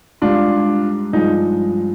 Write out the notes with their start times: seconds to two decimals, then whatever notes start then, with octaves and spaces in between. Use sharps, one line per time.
0.22 G#2 G3 D4 F4
1.13 G2 F3 G#3 D#4